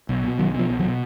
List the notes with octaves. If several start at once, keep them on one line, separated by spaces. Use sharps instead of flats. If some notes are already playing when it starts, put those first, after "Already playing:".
B1
B2
B1 D#3 F#3
B2 F3
B1
D#3 F#3
B2